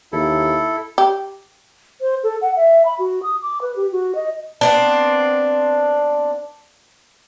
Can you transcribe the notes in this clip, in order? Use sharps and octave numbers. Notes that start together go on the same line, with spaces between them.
D#2 E4 A4
G4
C5
A4
F#5
E5
B5
F#4
D#6
D6
B4
G4
F#4
D#5
B3 C4 D4